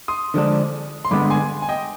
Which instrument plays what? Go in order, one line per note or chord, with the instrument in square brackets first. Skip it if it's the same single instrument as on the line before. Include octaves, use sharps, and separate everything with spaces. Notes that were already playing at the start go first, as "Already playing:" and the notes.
[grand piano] C6 D#6
[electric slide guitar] D3 F3 G#3 D4
[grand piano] C6
[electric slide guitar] G2 D3 G#3 B3 [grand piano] B5 D6
[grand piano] G#5 C6
G#5
D#5 G5